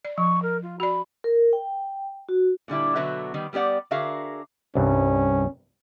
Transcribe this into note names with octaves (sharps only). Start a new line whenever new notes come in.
D5
F3 C#6
A#4
F4
F#4 D5 B5
A#4
G5
F#4
A#2 D3 G3 E4
B2 D3 F#3 B3 F#4 E5
D#3 G3 B3
G3 B3 G4 D5 F#5
D3 F#4 G#4 A#4 E5 F5
C2 G2 C#4